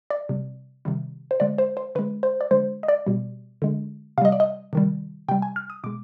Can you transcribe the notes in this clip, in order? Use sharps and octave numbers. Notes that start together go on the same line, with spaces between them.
D5
C3 G3
C3 D#3 G3
C5
D3 G#3 D5
C5
C5
D3 G#3 B4
C5
D5
D3 G#3 C5
D#5
D5
B2 G3
D3 G#3
C3 G3 D#5 F5
D5
D#5
C3 D#3 G3
C3 G3 G5
G#5
F6
D#6
B2 G#3 D6